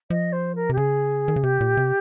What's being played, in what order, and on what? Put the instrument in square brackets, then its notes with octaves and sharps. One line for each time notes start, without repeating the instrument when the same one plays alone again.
[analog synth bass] F3 [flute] D#5
[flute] C5
A#4
[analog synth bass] C3
[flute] G4
[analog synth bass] C#3 [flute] G#4
[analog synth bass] D#3
C#3
[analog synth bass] C3 [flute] G4
[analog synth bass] A#2
C3